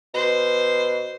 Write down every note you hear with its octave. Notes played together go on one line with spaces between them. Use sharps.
B2 C5